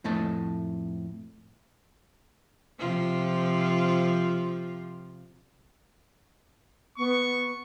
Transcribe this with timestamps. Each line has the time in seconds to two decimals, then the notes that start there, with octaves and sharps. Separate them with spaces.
0.04 F2 A2 A3 D#5 A5
2.79 C3 F3 F4
6.98 B3 C#6